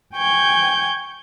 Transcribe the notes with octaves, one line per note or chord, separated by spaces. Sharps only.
G5 G#5 C#6 G6 G#6